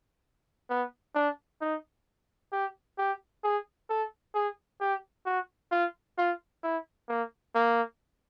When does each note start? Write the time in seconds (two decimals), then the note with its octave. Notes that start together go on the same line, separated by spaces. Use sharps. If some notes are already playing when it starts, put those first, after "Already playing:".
0.70 B3
1.15 D4
1.61 D#4
2.52 G4
2.98 G4
3.44 G#4
3.89 A4
4.35 G#4
4.81 G4
5.26 F#4
5.71 F4
6.18 F4
6.63 E4
7.09 A#3
7.55 A#3